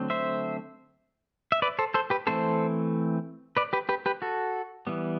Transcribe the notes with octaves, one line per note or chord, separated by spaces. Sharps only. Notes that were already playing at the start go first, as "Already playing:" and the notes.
Already playing: D3 F#3 A3 C4
C5 E5
E5
B4 D5
A4 C5
A4 C5
G4 B4
E3 A3 C4 A4 C5
B4 D5
G4 B4
G4 B4
G4 B4
F#4 A4
E3 G3 B3